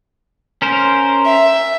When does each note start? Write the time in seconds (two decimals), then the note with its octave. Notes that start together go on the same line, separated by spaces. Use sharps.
0.62 C#4 A#4 C5
1.26 E5